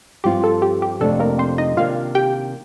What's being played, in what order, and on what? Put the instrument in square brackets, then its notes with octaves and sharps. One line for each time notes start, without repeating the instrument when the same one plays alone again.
[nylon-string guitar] G2 F3 C4 F4 [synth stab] G4
[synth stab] A4
G4
G4
[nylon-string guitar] F2 C3 F3 A3 D4 [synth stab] A4
[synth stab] A#3 A#4
C4 C5
D#4 D#5
[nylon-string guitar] C3 D#3 A#3 D4 [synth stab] F4 F5
[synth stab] G4 G5